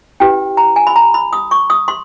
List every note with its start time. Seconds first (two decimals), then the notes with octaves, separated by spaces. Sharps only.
0.20 C#4 E4 G4 B4 G5
0.57 A#5
0.76 G#5
0.87 B5
0.96 A#5
1.14 B5
1.33 D#6
1.51 C#6
1.70 D#6
1.88 C6